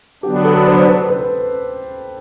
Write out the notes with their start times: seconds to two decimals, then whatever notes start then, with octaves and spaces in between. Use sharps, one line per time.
0.23 D3 F#3 B3 D4 G4
0.44 A4
0.67 C5
0.88 B4
1.10 B4